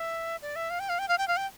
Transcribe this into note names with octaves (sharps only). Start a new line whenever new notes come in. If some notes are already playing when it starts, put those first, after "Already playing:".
Already playing: E5
D5
E5
F5
G5
F5
G5
F5
G5
F5
G5